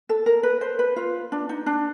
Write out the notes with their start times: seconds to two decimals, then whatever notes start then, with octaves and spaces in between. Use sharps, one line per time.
0.09 A4
0.26 A#4
0.43 B4
0.61 C5
0.79 B4
0.96 F4
1.32 D4
1.49 D#4
1.66 D4